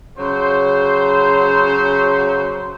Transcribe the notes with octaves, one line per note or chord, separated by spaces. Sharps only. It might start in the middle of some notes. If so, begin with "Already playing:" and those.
C#3 F#3 C5